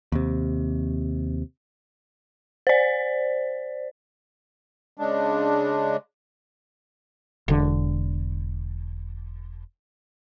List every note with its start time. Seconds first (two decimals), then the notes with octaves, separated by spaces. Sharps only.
0.12 D#2 C3
2.67 C5 D5
4.97 C#3 G#3 D4
7.48 E1 D3